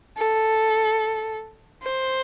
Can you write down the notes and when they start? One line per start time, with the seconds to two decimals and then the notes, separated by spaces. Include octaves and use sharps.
0.18 A4
1.82 C5